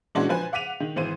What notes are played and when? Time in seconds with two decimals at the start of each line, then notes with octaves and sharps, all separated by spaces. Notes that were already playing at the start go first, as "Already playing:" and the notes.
0.15 A#2 E3 G#3 C#4 D4 F#4
0.29 F3 B4 C5 G#5 F#6
0.52 F5 F#5 D6 B6 D#7 F7
0.80 D#3
0.96 G#1 E3 C5 D#7